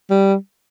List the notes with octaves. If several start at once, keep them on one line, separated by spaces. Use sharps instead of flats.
G3